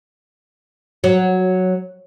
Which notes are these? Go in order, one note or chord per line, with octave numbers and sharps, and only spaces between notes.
F#3